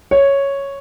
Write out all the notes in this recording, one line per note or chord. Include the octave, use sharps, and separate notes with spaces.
C#5